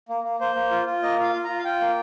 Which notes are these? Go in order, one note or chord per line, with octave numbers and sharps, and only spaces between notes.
A#3
A#3
A#3 C5
A#3
F4
F4
A#3 D#5
F4 F5
F4
F4 A#5
F5
F4 G5
A#3